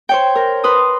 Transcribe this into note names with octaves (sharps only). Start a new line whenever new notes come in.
C5 C#5 G5
A#4
B4 C6 D#6